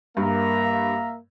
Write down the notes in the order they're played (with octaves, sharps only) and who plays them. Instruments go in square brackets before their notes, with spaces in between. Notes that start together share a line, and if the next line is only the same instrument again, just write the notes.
[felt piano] G2 [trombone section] A#3 [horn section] E5 F5 A#5